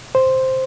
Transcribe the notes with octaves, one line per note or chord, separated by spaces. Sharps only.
C5